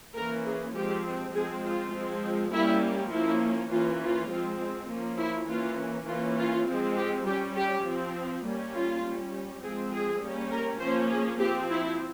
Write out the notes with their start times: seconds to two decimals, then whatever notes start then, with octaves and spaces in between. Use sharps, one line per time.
0.16 E3 A#3 C#4 A#4
0.46 G#4
0.75 F3 G#3 C4 G4
1.34 F3 G#3 C4 G#4
1.64 F4
1.94 F3 G#3 C4
2.53 G3 A#3 C#4 E4
3.12 F3 A#3 C#4 E4
3.71 E3 A#3 C#4 F4
4.01 F4
4.30 F3 G#3 C4
4.89 F3 A#3 C#4
5.19 E4
5.48 E3 A#3 C#4 F4
6.07 E3 A#3 C#4 F4
6.37 F4
6.67 F3 G#3 C4
6.96 G4
7.26 G3 C#4 G4
7.56 G4
7.85 F3 C4
8.44 G3 A#3 C#4
8.74 F4
9.03 G3 C#4
9.62 F3 G#3 C4 G#4
9.92 G#4
10.21 G3 A#3 C#4
10.51 A#4
10.81 F3 A#3 C#4 C5
11.10 G#4
11.40 F3 C4 G4
11.70 E4